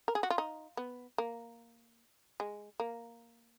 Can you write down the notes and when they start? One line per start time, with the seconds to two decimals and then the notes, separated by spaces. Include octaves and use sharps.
0.08 A#4
0.15 G#4
0.23 F#4
0.30 F4
0.38 D#4
0.77 B3
1.18 A#3
2.40 G#3
2.80 A#3